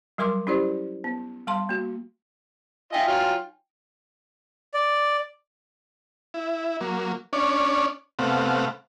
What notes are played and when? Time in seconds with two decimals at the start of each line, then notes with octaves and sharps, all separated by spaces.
0.18 F#3 G3 A#4 C6 D6
0.47 C#4 E4 G4 C5 D5
1.04 B3
1.47 G3 F5 A5 C6
1.69 A#3 F#4
2.93 D#4 F4 D#5 E5 G5 G#5
3.08 F#3 F4 F6
4.74 D5
6.34 E4
6.81 F#3 A#3
7.33 C#4 D4 C#5 D5
8.19 C3 A3 B3 C4 F5 F#5